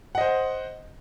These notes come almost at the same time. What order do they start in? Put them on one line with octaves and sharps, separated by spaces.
F#5 D#5 C5